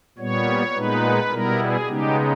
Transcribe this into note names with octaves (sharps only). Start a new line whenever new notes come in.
A#2 G3 B3 C#5
A#2 G#3 B3 D#4 B4
B2 G3 B3 E4 A#4
G#4
C#3 G#3 B3 D#4 G4